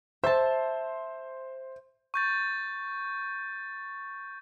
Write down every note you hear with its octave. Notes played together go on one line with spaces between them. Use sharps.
C5 E5 A5
C#6 G6 A6